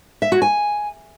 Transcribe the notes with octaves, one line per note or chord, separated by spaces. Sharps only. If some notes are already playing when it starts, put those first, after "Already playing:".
E5
F#4
G#5